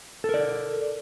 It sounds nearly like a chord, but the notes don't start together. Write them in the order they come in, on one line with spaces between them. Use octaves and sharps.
A4 A#4 D5